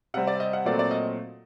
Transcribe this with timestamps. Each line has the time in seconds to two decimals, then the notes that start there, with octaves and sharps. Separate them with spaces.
0.14 C3 G3 C4 F#5
0.27 D5
0.40 D#5
0.53 F#5
0.65 A#2 F#3 A3 C4 D5
0.79 D5
0.91 D#5